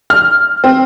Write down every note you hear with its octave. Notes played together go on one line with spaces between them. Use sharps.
F6
C4